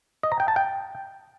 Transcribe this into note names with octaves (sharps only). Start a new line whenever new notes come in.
D#5
A#5
G5
A5
G5